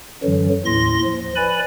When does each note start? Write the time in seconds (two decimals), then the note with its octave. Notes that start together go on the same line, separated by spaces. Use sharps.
0.23 F#2 D3 E3 F#3
0.66 D#2 A2 C6 A#6
1.05 F3
1.36 B4 D5 G#5 B5